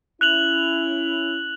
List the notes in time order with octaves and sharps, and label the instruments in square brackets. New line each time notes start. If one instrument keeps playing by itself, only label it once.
[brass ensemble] C#4 E4 [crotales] F#6 F7 F#7